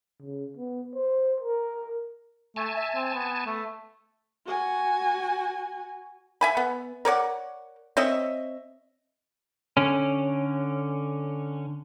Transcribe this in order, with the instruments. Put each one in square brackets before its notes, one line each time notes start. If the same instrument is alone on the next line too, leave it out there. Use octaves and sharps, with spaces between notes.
[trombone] C#3
B3
C5
A#4
[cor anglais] A3 [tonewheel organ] G#5 A5
[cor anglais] E5
C4
B3
A3
[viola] F#4 G#5
[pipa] E5 G#5 B5
B3
A#4 C#5 D5 F#5
C4 C#5 D#5 E5
[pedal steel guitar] D3 C#4